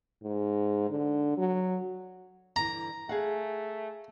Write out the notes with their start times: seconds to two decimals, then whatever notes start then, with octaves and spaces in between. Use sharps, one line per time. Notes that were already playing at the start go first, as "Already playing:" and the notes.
0.23 G#2
0.90 D3
1.37 F#3
2.56 G2 D3 E3 A#5
3.09 A3 G#4 F5 F#5